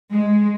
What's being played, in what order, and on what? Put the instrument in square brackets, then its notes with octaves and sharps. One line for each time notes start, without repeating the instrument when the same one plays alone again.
[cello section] G#3